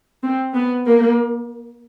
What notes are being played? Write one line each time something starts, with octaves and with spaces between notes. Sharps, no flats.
C4
B3
A#3